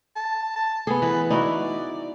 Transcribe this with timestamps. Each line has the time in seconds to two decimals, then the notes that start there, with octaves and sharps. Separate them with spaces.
0.16 A5
0.56 A5
0.87 B3 G#4 A4
1.02 E3 B4
1.30 D#4 E4 F#4 D5